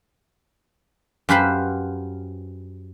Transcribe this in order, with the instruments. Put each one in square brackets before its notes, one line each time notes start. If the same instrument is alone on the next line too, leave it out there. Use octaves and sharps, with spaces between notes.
[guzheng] F#2 F4 G4 B4 C5 B5